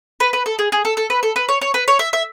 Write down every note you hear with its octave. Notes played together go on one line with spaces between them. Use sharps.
B4
B4
A4
G#4
G#4
A4
A4
B4
A4
B4
C#5
C#5
B4
C#5
E5
E5